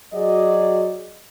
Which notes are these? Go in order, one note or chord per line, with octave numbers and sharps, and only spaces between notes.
F#3 F#4 G#4 D5 D#5